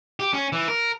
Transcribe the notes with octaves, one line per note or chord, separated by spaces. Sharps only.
G4
C#4
E3
A#4